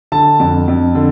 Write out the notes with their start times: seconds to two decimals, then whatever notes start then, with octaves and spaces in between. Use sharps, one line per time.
0.12 D3 A5
0.40 F2
0.68 F2
0.95 D3